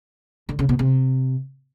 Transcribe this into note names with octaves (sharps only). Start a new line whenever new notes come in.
D3
C#3
B2
C3